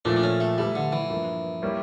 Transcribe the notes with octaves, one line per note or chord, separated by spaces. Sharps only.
A#2 F3 A3 D4
D4
C#4
A3
E3 G3 A3 E4 A4 E5
D3
E3
G2 F3 A#3 E4
G3 A#3 E4 G4 C#5